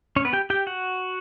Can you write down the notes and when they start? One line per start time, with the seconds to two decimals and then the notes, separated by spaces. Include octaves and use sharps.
0.16 C#4 C#5
0.25 B3 B4
0.33 G4 G5
0.50 G4 G5
0.67 F#4 F#5